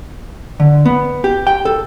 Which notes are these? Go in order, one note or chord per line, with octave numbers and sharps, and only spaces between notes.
D3
B3
G4
G5
A4